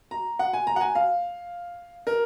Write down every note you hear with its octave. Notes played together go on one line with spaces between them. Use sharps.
A#5
F#5
G#5
A#5
F#5
G#5
F5
A#4